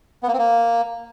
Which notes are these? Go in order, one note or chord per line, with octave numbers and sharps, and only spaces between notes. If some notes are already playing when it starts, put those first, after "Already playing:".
B3
A#3
C4
A#3